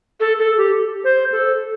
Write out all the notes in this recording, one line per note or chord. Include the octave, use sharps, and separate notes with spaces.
A4
A4
G4
C5
A4